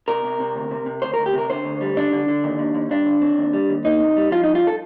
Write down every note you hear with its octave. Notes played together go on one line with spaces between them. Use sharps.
C3 A#4
C3
C3
D2
C3
C3
D2 C5
D2 A#4
G4
C3 A#4
D3 C5
D2
G3
D3 D4
D3
D3
D#2
D#2
D#2
G2 D4
D3
C4
D#2
G3
D#2
A#3 D#4
C3
G3
F3 F4
G2 D#4
F4
A4